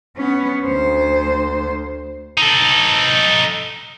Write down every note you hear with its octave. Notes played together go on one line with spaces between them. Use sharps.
B3 C#4
D2 C5
D#4 A4